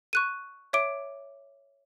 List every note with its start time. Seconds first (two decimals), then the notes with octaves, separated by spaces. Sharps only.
0.13 C#6 F#6 D#7
0.73 C#5 E5 D6 D7